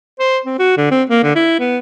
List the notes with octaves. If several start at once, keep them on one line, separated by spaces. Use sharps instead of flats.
C5
C4
F#4
D3
C4
A#3
D3
E4
B3